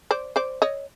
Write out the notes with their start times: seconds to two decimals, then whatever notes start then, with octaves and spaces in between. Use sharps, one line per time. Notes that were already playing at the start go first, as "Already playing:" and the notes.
0.11 C5 D5
0.36 C5 D5
0.62 C#5 D#5